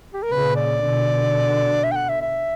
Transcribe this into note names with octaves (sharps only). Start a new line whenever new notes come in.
G4
A#4
A#2 C#3 B4
D5
B2 D3
E5
G5
F#5
E5
E5